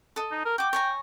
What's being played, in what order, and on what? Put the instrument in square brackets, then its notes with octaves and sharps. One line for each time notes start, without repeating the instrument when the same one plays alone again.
[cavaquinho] A4 D#5
[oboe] D#4
A#4
[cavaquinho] F#4 D6 [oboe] G5
[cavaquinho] C#5 G#5 A#5